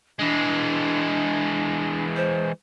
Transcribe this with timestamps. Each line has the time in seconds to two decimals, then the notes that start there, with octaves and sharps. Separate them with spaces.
0.19 E3 G#3 D4
2.16 C5